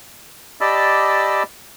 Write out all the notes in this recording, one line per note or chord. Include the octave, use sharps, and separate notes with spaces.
G4 D5 D#5 A5 B5 E6